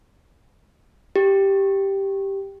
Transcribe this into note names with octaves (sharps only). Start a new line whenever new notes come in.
G4